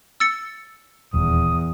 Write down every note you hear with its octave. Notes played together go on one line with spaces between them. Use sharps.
E6 A6 C#7
D#1 E2 D#6